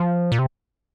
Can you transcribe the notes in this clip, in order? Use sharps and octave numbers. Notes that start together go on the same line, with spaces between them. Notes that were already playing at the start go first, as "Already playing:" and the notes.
Already playing: F3
A#2
C3